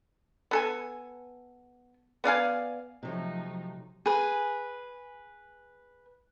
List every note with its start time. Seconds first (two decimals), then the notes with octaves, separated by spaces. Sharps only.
0.51 B3 A4 G#5
2.24 B3 D5 F5 G#5
3.03 C3 F3 F#3 A3 D#4
4.06 G#4 B4